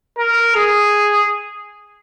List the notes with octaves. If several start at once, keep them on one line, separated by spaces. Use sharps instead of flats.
A#4
G#4